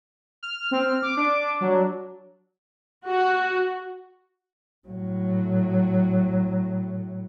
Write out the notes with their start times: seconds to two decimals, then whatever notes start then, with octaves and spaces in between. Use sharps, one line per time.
0.43 F6
0.71 C4
1.02 D6
1.17 D4
1.61 F#3
3.06 F#4
4.88 A2 F#3